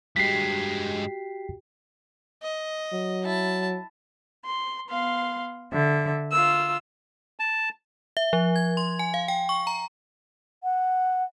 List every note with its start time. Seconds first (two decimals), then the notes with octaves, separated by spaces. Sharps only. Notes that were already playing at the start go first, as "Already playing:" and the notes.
0.16 G2 G#3 F#4 G4 G5 B6 C7
2.42 D#5
2.93 F#3
3.23 E4 A5
4.46 C6
4.89 B3 F5 C6
5.72 D3 E5
6.31 F4 E6
7.40 A5
8.17 E5
8.33 F3
8.56 G#6
8.77 C6
8.99 G#5
9.14 F5
9.28 G5
9.49 C#6
9.67 A#5
10.63 F#5